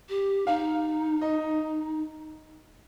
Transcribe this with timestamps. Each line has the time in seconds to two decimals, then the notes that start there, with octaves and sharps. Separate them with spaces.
0.09 G4
0.47 D#4 F5
1.21 D#5